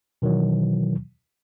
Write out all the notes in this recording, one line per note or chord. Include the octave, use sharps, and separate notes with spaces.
B2 D#3 E3 F#3